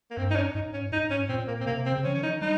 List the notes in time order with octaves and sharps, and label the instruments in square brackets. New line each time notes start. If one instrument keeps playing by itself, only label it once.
[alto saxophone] A#3
[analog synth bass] G2 [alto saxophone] C4
[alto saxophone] D#4
C#4
[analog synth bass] G#2 [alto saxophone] D#4
[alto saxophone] C#4
[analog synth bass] G#2 [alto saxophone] D#4
[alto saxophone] C#4
[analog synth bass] A#2 [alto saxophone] C4
[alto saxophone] A#3
C4
[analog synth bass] C3 [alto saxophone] A#3
[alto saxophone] C4
[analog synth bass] C#3
[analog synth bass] F3 [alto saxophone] C#4
[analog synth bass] D#3 [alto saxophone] C#4
[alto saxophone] D#4
[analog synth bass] G3 [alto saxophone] D#4